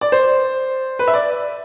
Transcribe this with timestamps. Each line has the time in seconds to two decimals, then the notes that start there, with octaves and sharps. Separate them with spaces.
0.01 D5
0.12 C5
0.99 B4
1.08 E5
1.14 D5